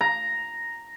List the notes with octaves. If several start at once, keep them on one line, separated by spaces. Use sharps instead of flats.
A#5